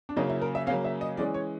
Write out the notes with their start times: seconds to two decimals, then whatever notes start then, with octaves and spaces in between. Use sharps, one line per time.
0.09 D4
0.16 C#3 F#3 A#3 C#4 D#4
0.30 E4
0.41 A#4
0.55 E5
0.67 C#3 F#3 A#3 C#4 F5
0.84 E5
1.01 D#5
1.17 E3 G#3 C#4 D5
1.34 C#5